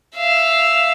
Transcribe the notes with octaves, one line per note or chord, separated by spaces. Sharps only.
E5 F5